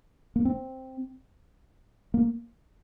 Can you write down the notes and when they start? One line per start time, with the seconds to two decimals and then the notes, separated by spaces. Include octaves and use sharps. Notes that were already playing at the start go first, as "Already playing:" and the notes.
0.36 A#3
0.45 C4
2.14 A#3